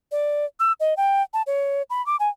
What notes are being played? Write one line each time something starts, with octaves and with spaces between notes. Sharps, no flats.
D5
E6
D#5
G5
A5
C#5
B5
D6
G#5